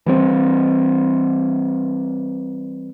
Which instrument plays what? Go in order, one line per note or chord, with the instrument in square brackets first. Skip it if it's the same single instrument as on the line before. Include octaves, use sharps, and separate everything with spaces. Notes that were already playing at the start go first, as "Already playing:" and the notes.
[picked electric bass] E3 G3 C4